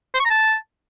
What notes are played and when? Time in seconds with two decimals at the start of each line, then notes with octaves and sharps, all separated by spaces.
0.14 C5
0.20 C#6
0.25 A#5
0.30 A5